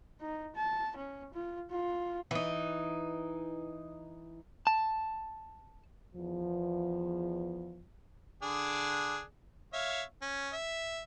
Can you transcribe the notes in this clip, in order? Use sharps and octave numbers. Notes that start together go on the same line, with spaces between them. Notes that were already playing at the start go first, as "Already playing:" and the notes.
D#4
A5
C#4
F4
F4
E3 D#4
A5
E2 F3
D3 D4 G#4
C#5 E5 F5
C#4
E5